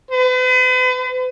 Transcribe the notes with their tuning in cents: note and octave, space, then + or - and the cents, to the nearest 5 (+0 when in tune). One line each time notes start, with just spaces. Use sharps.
B4 +45